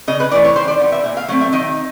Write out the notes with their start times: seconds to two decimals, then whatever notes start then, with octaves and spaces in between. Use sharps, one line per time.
0.08 C#3 D#5
0.20 B4
0.31 E3 A3 D5
0.44 C#5
0.55 D#3 C5
0.68 D5
0.80 G3 B3
0.92 E5
1.04 A#2 E5
1.17 F5
1.28 F#3 A3 C4
1.41 E5
1.53 D#3 D#5